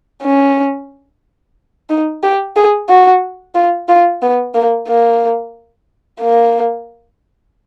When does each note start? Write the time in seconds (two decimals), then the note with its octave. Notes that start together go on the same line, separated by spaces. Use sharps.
0.23 C#4
1.90 D#4
2.23 G4
2.56 G#4
2.89 F#4
3.55 F4
3.88 F4
4.22 B3
4.54 A#3
4.88 A#3
6.21 A#3